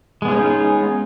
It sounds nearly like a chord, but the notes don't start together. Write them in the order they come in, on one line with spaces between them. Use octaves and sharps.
G#3 B3 F4 C#4 D#4